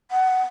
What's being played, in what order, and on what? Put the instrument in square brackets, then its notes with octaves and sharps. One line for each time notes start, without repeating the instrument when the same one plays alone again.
[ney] F#5